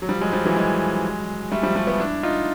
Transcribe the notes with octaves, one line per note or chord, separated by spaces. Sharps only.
F#3
F3 G3
F#3 G#3
F3 G3
E3 F#3
F#3 G#3
G3 A3
F3 G3
G3 A3
A3 B3
D4 E4
D#4 F4